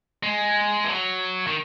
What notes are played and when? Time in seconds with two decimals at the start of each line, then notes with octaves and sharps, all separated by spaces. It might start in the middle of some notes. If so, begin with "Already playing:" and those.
0.23 G#3
0.84 E3
0.89 F#3
1.47 D#3